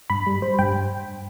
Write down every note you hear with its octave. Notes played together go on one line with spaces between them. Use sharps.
G2 B5
G3
G3 C5
G2 G5